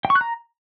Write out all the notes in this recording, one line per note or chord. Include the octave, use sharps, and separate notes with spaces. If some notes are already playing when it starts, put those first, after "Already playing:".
G5
C#6
F#6
A#5